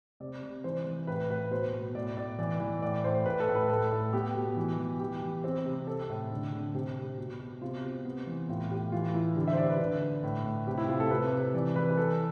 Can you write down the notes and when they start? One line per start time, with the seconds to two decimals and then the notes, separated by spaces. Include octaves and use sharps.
0.20 C3 D5
0.43 C3
0.64 E3 C5
0.86 E3
1.07 A2 B4
1.30 A2 B4
1.51 B2 C5
1.73 B2
1.95 A2 D5
2.17 A2 D5
2.39 E3 D5
2.60 E3
2.82 A2 D5
3.04 A2 C5
3.26 A2 B4
3.40 A4
3.48 A2
3.55 B4
3.69 A2 A4
3.92 A2
4.13 B3 G4
4.35 B2
4.57 E3
4.78 E3
5.00 E3 G4
5.22 E3
5.44 C4
5.65 C3
5.87 C4 A4
6.10 A2
6.31 D3
6.53 D3
6.74 C3 G4
6.96 C3
7.18 B2
7.40 B2
7.61 C3 F4
7.84 C3
8.05 B3
8.27 E3
8.49 A2 F4
8.70 A2 G4
8.92 E3 F4
9.14 E3 E4
9.36 D3 G4
9.47 E5
9.53 C5
9.57 D3 D5
9.69 B4
9.79 D3
10.02 D3
10.23 A2
10.45 A2
10.67 C3 G4
10.78 E4
10.88 C3 F4
11.00 A4
11.10 C3 B4
11.33 C3
11.54 E3 D5
11.76 E3 B4
11.91 B4
11.97 E3 A4